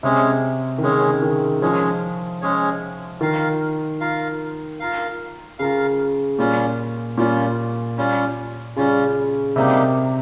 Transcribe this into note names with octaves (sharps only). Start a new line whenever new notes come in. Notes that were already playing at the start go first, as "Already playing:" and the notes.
C3 G#3 C#4 G#4 C#5
D#3
C#3 G#3 C#4 G#4 C#5
D#3
F3 G#3 C#4 G#4 C#5
G#3 C#4 G#4 C#5
D#3 F4 A#4 F5
F4 A#4 F5
F4 A#4 F5
C#3 F4 A#4 F5
A#2 G3 C#4 F4
A#2 G3 C#4 F4
G3 C#4 F4
C#3 G3 C#4 F4
C3 G3 A#3 D#4 G4